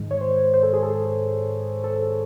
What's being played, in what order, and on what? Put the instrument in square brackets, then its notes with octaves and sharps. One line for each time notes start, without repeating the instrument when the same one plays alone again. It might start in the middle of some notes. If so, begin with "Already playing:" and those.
Already playing: [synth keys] G#2 D#3 G#3
C#5
C5
C5
A4
G#4
A4
A4